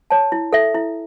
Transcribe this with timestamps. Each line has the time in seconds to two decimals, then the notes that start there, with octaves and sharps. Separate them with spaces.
0.10 C#5 A5
0.32 E4
0.53 A4 E5
0.75 E4